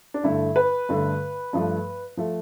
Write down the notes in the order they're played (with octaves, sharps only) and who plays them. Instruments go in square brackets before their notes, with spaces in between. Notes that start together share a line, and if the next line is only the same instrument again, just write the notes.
[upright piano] D4
G2 D3 A3 E4
B4
G2 D3 A3
G2 F3 A3
F3 A3